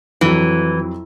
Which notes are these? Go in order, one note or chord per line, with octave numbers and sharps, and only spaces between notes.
F2 E3 F#3